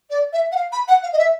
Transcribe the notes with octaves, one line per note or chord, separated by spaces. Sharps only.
D5
E5
F#5
F5
B5
F#5
F5
D#5
E5